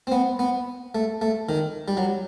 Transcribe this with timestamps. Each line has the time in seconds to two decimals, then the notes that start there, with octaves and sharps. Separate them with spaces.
0.07 C4
0.12 B3
0.39 B3
0.95 A3
1.21 A3
1.49 D#3
1.88 G3
1.97 F#3